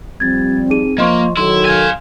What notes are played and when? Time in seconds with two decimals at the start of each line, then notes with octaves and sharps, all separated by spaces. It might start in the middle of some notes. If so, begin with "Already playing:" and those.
0.20 F3 G3 C4 G#6 A6
0.70 D#4 G#4 D#7
0.98 F3 A#3 D#5 C6 C#6
1.37 D#3 F#3 E4 A4 C6
1.65 F5 G#5